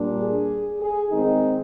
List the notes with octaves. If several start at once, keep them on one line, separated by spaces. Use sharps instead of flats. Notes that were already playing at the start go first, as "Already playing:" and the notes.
Already playing: A#2 G3 A#3 D4
G#4
G#4
D#3 G#3 C4 D#4 G#4